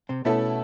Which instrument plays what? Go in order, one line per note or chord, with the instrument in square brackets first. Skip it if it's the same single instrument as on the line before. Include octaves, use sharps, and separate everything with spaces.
[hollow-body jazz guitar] C3 C4
[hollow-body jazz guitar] B2 B3 [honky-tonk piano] A3 C#4 E4 A4